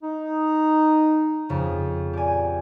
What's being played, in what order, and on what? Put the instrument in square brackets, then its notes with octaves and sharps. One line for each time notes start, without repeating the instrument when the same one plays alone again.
[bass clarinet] D#4
[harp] F2 C#3
[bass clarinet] A#2 [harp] G4 G#5